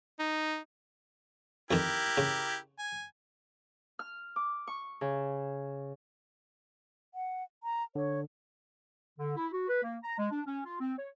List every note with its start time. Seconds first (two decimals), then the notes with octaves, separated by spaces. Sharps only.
0.19 D#4
1.71 F2 D#3 E4 G4 A#4
2.17 C#3
2.79 G#5
3.99 F6
4.36 D6
4.67 C#6
5.01 C#3
7.13 F#5
7.63 A#5
7.95 D3 C#5
9.19 D3
9.36 E4
9.52 F#4
9.68 B4
9.83 A#3
10.03 A#5
10.18 G#3
10.31 D4
10.46 C#4
10.65 F4
10.80 C4
10.97 C#5